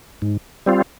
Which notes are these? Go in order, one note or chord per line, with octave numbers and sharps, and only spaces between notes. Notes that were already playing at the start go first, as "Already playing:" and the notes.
G#2
G3 C4 F4